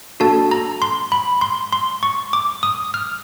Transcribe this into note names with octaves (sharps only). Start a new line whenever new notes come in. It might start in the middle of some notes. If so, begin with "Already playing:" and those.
A#3 D4 F#4 A4 A5
A#5
C6
B5
C6
C6
C#6
D6
D#6
F6